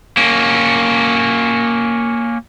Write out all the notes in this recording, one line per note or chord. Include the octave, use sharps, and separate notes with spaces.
A#3 C#4